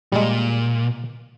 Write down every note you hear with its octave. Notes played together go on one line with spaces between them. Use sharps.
A#2 G3 G#3